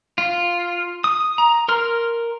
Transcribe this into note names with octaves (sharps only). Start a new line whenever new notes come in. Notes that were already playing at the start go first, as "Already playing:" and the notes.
F4
D#6
A#5
A#4 C6 F6